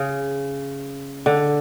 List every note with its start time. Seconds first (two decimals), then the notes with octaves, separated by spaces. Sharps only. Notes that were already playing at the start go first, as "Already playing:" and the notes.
Already playing: C#3
1.26 D3